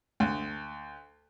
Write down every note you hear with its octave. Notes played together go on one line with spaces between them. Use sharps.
D2